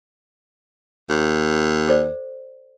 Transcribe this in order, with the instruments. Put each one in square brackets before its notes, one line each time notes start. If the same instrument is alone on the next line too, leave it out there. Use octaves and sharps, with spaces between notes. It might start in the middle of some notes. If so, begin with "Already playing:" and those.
[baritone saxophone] D#2
[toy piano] A4 C5 D5